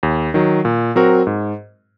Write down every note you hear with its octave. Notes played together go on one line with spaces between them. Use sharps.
D#2
D#3 F#3
A#2
F#3 C4 F#4 A#4
G#2